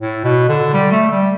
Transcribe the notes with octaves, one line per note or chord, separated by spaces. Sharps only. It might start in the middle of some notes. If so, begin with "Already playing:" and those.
A2
B2
D3
G3
A3
G3